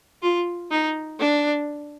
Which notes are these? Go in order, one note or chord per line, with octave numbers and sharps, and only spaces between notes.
F4
D#4
D4